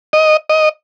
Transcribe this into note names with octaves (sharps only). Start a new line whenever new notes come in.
D#5
D#5